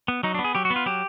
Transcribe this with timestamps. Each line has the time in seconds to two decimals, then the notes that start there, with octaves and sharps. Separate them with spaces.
0.08 B3
0.23 F#3 D#4
0.34 D4
0.39 B3
0.44 G#4
0.55 F#3 G4
0.65 F#4
0.70 B3
0.76 F4
0.86 F#3 G4